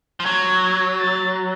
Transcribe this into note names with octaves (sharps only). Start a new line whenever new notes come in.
F3
F#3 G#6
A6